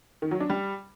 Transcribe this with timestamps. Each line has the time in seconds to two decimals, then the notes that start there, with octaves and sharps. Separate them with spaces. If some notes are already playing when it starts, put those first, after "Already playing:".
0.22 D#3
0.31 F#3
0.40 D4
0.50 G3